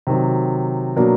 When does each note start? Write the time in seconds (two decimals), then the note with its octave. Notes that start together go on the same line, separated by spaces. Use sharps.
0.07 C3 D#3 F#3
0.96 B2 F#3 A#3 D4